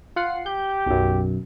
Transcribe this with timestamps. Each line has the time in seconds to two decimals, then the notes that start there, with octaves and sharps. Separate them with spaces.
0.16 F4 F#5 C7
0.46 G4 G6
0.86 B1 F#2